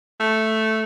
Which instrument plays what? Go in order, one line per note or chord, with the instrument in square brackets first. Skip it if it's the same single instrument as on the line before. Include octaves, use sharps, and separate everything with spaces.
[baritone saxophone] A3